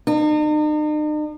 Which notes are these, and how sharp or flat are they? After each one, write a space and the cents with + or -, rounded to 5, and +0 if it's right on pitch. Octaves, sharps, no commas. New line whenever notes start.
D#4 -45